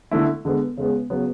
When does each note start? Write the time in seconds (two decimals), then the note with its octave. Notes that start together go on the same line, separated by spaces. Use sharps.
0.11 D3 A3 E4
0.45 D3 G#3 B3
0.77 C#3 G#3 B3
1.10 C#3 F#3 B3